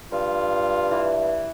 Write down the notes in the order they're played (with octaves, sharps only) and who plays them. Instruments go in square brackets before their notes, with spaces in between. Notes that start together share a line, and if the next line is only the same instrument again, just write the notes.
[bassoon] G2 [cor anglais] F4
[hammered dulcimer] E3